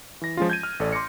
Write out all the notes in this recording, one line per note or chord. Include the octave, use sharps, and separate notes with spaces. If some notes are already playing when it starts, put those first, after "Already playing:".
E3 A#6
F3 G#3 C#4 F4
G6 G#6 D#7
F6
A1 A4 D5
C6 D6 A#6 C#7